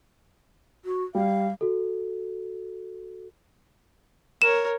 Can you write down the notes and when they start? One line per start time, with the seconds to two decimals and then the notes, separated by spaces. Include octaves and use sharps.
0.85 F#4
1.15 G3 F5
1.61 F#4 A4
4.42 A#4 C#5 E7